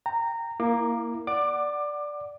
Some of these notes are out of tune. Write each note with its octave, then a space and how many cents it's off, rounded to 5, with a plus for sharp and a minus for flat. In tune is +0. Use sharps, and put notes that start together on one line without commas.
G5 +0 A#5 -15
A#3 +0 E4 +0 D6 +25
D5 +0 F#5 +5 D6 +20